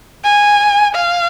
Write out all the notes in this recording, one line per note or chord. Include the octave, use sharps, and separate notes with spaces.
G#5
F5